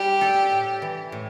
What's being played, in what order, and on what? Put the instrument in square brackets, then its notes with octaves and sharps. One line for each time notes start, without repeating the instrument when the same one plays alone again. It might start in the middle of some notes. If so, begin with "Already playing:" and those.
Already playing: [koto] G3 D4 [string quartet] G4
[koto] A4
A2
E3
A2